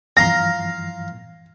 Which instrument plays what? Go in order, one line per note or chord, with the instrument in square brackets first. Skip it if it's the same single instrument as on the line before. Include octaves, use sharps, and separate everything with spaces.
[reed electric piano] G2 E3 F3 [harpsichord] F5 A#5 C6 [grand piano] A#6